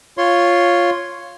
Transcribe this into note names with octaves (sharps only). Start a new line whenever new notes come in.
F4 C#5 C6